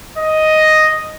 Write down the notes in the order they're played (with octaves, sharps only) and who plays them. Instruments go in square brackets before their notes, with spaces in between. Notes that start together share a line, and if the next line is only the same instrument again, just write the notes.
[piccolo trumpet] D#5